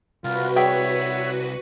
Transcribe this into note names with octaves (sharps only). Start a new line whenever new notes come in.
C2 F4 F#4 B4
G3 G#4 C#5 E5 G5